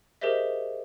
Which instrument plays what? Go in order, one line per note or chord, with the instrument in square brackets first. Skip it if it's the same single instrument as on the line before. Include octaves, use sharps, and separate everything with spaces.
[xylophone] G4 G#4 A#4 C5 D#5 E5